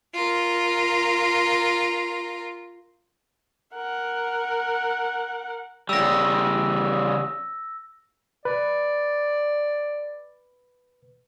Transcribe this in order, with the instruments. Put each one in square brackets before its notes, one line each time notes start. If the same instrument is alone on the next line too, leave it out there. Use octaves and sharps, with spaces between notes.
[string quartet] F4 A#4
[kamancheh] A#4 F#5
[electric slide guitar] C#3 G3 [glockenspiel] E6 A#6
[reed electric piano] B4 [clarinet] D5